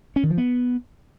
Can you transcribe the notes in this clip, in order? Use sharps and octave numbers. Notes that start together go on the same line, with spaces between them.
C#4
D#3
F3
B3